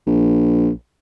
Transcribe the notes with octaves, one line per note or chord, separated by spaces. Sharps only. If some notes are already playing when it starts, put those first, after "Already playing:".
A#1